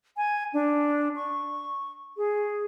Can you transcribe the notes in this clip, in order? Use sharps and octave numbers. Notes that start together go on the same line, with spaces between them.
G#5
D4
C#6
G#4